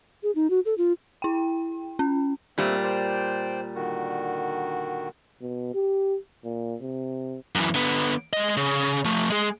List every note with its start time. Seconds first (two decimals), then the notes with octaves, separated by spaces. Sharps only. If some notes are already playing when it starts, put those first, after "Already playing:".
0.23 G#4
0.35 D#4
0.50 F#4
0.66 A4
0.78 F4
1.22 E4 G5
1.99 C#4
2.58 A#2 G3 A3 C4
2.84 C5 D5 G5
3.75 D3 D#3 F#4
5.42 B2
5.74 G4
6.44 A#2
6.81 C3
7.55 F#2 E3
7.75 D3 B3
8.33 G#3 D#5
8.57 C#3
9.05 F3 A3
9.30 G#3 G#4